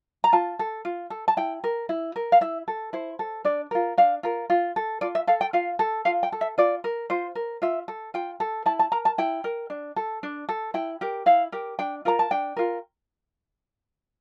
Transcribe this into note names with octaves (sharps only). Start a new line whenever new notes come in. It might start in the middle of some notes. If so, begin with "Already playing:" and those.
A#5
F4 A5
A4
F4
A4
A5
E4 G5
A#4
E4
A#4
F5
E4 E5
A4
E4 C5
A4
D4 D5
F4 A#4
D4 F5
F4 A#4
F4
A4
F4 D5
E5
A4 F5
G5
F4 F5
A4
F4 F5
G5
A4
E5
F4 D5
A#4
F4 C5
A#4
F4 E5
A4
F4 G5
A4
E4 A5
A5
A#4 A#5
A5
E4 G5
A#4
D4
A4
D4
A4
E4 G5
G4 A#4
E4 F5
G4 A#4
D4 G5
F4 A#4 A#5
A5
D4 G5
F4 A#4